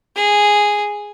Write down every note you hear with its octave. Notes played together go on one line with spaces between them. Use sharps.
G#4